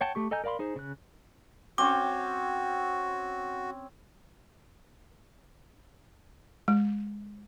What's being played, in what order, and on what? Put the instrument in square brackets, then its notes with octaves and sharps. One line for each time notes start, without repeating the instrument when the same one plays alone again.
[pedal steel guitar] C#5 F#5 G5 A5
A3 G4 C#6
A4 D#5 G#5 A#5 G6
A#4 D5 F5 B5 C6
D#4 G#4 C5
C#3 F#6
[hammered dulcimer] C4 C#4 C#5 [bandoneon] F#4 [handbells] D6
[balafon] G#3